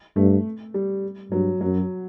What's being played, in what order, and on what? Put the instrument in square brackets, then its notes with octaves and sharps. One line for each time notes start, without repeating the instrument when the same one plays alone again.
[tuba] G2 [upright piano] A3
[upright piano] G3
[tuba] G2 [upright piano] F#3
[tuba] F#2 [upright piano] F#3